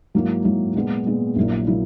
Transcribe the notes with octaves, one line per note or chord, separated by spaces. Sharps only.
G#2 F#3 A#3 E4
G#2 F#3 A#3 E4
A#2 G#3 B3
A#2 G#3 B3
A#1 A#2 F#3 A#3 E4
A#2 F#3 A#3 E4